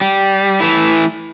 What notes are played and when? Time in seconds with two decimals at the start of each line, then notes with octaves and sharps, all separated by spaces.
0.01 G3
0.60 E3 A3 E4